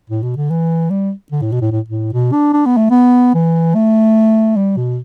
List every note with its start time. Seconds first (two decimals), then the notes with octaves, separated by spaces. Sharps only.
0.10 A2
0.23 B2
0.36 D3
0.50 E3
0.90 G3
1.32 D3
1.42 A2
1.52 B2
1.61 A2
1.72 A2
1.88 A2
2.13 B2
2.32 D4
2.53 D4
2.66 B3
2.77 A3
2.90 B3
3.34 E3
3.75 A3
4.56 G3
4.77 B2